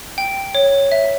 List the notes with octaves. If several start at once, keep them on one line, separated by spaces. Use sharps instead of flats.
G5
C#5
E5